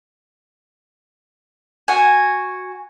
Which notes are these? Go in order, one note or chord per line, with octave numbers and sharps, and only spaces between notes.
F#4 G#5